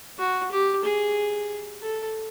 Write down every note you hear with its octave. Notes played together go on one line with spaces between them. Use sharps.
F#4
G4
G#4
A4